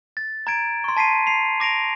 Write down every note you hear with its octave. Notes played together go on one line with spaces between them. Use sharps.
A6
A#5 G#6 D7
C6 C#6
A5 B6 C7 D#7
C7 F7
D6 A#6 D7 F7